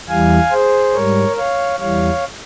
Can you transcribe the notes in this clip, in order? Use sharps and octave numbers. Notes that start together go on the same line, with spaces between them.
E2 E3 G3 F5 G#5
G#4 C5
G#2 G3 A#4 C#5
C#5 F5
E2 E3 G3 C#5 F5